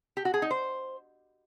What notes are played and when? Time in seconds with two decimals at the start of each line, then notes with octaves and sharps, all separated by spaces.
0.17 G4
0.25 F#4
0.34 G#4
0.42 D#4
0.51 C5